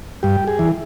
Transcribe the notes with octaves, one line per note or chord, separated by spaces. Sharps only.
G2 G4
G#4
E3